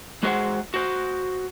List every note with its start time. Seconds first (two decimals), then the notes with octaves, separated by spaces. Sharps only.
0.23 G#3 F#4 G#4 C5 D#5 F#5
0.74 F#4 C5